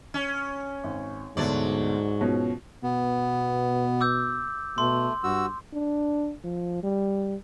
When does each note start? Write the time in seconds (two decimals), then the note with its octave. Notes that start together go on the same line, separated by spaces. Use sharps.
0.14 C#4
0.84 G#1
1.37 D2 G#2 B2 D3 F#3 D5
2.21 B2 F3 C#4
2.83 B2 B3
4.01 D6 E6 G6
4.78 B2 A3 C6
5.24 G2 F#4 E6
5.73 D4
6.44 F3
6.83 G3